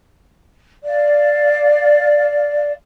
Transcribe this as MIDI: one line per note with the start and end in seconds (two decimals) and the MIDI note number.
0.85 2.72 74
0.85 2.72 77